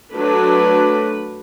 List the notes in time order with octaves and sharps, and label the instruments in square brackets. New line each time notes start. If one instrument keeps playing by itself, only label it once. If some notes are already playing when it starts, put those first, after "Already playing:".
[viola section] F#3 A3 D4 B4